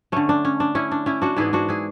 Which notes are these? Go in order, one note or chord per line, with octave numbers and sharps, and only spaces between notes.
D3 A3 C#4
D4
C#4
D4
C#4 E4
D4
C#4 E4
D4 F#4
G#2 E3 B3 E4 G#4
D4 F#4
E4 G#4